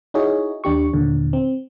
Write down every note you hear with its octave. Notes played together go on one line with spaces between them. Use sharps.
D#4 E4 F#4 G#4 C#5 D#5
D#2 D4 G4 C#6
D#2 A#2 D3
C4